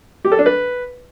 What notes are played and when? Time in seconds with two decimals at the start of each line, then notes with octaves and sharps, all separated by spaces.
0.25 G4
0.32 A4
0.39 D4
0.46 B4